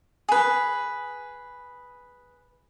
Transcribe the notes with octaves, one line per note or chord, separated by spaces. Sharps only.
G#4 B4